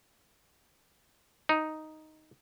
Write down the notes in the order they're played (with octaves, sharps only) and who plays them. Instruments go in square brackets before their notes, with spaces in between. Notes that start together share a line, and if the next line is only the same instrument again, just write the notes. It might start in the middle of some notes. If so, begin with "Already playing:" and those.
[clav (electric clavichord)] D#4